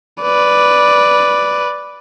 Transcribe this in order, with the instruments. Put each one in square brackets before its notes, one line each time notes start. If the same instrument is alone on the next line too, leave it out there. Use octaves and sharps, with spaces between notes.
[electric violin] B4 D5